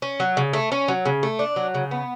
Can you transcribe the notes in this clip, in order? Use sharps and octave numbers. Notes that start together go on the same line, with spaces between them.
C#4
F#3
C#3
A3
C#4
F#3
C#3
A3
D4
F#3
C#3
B3